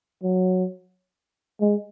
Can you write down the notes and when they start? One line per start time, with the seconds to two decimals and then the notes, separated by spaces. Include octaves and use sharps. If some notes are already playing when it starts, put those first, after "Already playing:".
0.23 F#3
1.61 G#3